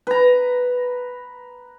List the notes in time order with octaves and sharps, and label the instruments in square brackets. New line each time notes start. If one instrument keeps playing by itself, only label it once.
[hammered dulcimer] B4 A#5